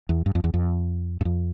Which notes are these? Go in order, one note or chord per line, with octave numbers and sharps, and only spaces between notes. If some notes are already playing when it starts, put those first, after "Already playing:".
E2
G2
F2
E2
F2
G2
F2